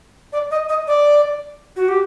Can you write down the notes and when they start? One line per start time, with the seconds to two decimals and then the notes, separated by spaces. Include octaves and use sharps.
0.33 D5
0.51 D#5
0.69 D#5
0.87 D5
1.76 F#4
1.88 G4